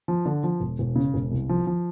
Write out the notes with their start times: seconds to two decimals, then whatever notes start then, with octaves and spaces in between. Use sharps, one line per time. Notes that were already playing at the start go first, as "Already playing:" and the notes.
0.08 F3
0.26 D3
0.44 F3
0.60 E1
0.79 E1
0.96 C#3
1.14 E1
1.31 C2
1.49 F3
1.67 F3